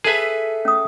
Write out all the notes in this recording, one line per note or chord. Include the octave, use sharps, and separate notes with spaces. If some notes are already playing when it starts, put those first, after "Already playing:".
G#4 A4 B4 E5
C#4 D#6